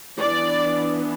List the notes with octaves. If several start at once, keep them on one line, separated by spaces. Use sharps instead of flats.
E3 B3 D4 D5